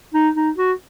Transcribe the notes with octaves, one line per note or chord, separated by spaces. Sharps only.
D#4
D#4
F#4